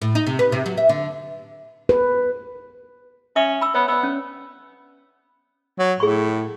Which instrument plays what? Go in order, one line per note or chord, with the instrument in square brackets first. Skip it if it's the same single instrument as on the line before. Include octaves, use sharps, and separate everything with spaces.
[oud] A2
D#4
C3
B4
C3
F#3
E5
D3
[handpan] B4
[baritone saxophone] C#4 [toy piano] E5 D#6
[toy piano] B5 E6
[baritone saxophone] B3 [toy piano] C#5
[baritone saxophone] B3 [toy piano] D5 E6
[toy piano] C#4
[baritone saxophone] F#3
[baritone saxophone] A2 [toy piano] G#4 C#6